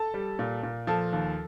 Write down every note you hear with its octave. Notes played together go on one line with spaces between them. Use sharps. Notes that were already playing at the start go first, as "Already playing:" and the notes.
Already playing: A4 A5
G3
A#2
A#2
F3 A4 A5
D#2